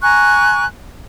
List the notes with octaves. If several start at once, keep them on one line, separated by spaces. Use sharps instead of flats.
G#5 A#5 C#6 F#6